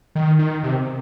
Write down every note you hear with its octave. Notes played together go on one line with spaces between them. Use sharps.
D#3
D#3
C3